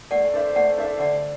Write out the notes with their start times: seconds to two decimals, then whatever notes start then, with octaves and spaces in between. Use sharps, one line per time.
0.11 A3 D5 F#5
0.34 D4 A4 C5 E5
0.55 A3 D5 F#5
0.78 D4 A4 C5 E5
1.00 D3 D5 F#5